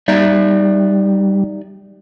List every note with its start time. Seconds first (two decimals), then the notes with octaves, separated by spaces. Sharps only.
0.08 G3 D#4 D5 E5